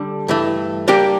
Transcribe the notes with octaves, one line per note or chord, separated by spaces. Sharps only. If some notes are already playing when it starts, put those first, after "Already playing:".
Already playing: D3 G3 D4 A4
G2 E3 A3
G3 A#3 D4 G4